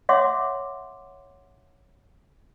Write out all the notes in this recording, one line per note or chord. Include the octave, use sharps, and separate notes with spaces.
C#5 E5 F#5 C6 D6